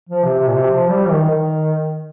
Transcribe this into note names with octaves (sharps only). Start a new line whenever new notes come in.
F3
C3
C3
A#2
C3
F3
G3
D#3
D#3